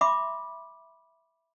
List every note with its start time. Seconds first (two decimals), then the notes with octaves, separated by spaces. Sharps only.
0.01 E5 B5 C6 D6